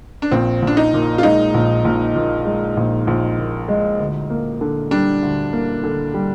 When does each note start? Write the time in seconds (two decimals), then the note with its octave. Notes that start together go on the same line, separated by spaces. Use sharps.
0.22 D4
0.31 A#1 C4
0.62 A#1
0.67 D4
0.77 D#4
0.93 A#2
1.18 F4
1.23 G#3 D#4
1.54 A#1
1.85 A#1
2.15 A#2
2.45 G#3
2.77 A#1
3.07 A#1
3.38 A#2
3.68 G#3
3.99 D2
4.30 A#3
4.61 D3
4.91 G3 D4
5.22 D2
5.53 A#3
5.83 D3
6.14 G3